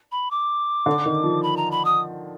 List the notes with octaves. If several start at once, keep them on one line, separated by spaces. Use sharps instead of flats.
B5
D6
D3
D#3
F3
B5
A#5
B5
D#6